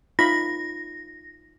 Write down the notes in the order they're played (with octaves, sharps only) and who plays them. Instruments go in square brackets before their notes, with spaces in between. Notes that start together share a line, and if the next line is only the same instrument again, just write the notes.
[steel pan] D#4 F4 B5 [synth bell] A#6